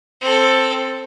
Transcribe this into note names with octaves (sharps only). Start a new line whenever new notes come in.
C4 A4